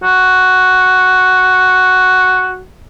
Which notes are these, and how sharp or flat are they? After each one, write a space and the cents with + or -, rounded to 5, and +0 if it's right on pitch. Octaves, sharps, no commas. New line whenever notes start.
F#4 +5